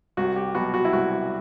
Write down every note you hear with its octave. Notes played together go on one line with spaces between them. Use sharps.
C2 F#4
G4
B2 F#3 F#4
F#4
E4
C2 F#4